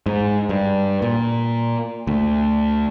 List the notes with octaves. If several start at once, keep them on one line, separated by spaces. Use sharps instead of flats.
G#2
G2
A#2
D2